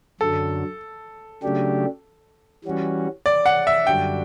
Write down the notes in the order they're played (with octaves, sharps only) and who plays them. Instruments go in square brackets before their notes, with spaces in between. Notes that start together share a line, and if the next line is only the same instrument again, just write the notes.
[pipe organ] F#2 D3 F#3 [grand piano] A4
[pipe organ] C#3 F#3 A3 D4 G4
E3 G3 C#4 F#4
[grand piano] D5
F#5
E5
[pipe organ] F#2 D3 G3 D4 F#4 [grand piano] G5